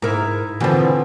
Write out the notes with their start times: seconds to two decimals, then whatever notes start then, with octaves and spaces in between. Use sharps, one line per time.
0.02 G#2 D#4 E4 A#4
0.60 B2 D3 E3 F3 C4